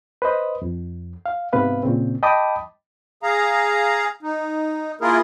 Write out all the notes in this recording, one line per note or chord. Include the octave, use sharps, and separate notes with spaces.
B4 C5 D#5
F2
F5
G#2 C3 B3 B4 F5
A#2 C#3 C4
D#5 G5 A5 B5 D6 D#6
G#4 F5 A#5
D#4
A#3 E4 F4 G#4 A#4